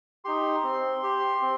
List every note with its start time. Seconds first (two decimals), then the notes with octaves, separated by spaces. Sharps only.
0.25 D#4 G4 C6
0.64 C4
1.03 G4
1.42 C4